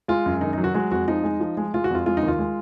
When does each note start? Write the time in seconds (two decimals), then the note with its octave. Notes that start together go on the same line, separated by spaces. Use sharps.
0.08 G#3 F4
0.26 F#2
0.41 D#3 D#4
0.53 D#4
0.58 F#3
0.64 F#4
0.74 G#3 F#4
0.91 F2 F#4
1.08 F3 D#4
1.24 G#3
1.40 F3
1.57 G#3
1.74 G#3 F4
1.84 F#4
1.90 F2 F4
2.06 G#3 F4
2.17 D#4
2.23 D#2 F4
2.39 G#3